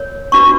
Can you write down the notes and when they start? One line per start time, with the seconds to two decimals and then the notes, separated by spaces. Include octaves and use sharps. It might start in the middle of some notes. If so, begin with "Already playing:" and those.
Already playing: A#4 C#5
0.32 D4 F#4 B4 C#6